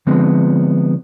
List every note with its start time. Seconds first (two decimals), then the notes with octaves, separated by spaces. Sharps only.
0.07 D3 F3 G#3 B3 C4